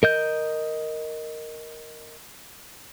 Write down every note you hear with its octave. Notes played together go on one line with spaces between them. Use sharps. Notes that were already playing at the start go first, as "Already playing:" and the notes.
A#4 D#5 G6